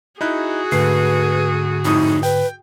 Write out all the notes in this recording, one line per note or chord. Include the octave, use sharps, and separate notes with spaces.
D#4 E4 F#4 G#4 F#6
D2 G#2 D3 A3 B4 C7
F2 A2 D#4 D#6
B4 G5